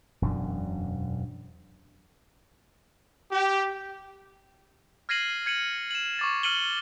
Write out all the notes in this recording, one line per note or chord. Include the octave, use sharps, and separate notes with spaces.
E1 F#2 B2 D4
G4
F6 G#6 A#6 C7 D#7 F#7
G#6 C#7 D#7 F#7
E7 F#7
C#6 D6 A6
F6 C#7 D#7 F#7 G7